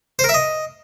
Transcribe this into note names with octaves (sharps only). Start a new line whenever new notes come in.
C5
A#4
E5
D#5